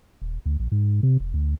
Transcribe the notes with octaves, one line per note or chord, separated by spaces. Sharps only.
D#1
D2
A#1
G#2
C3
E1
D2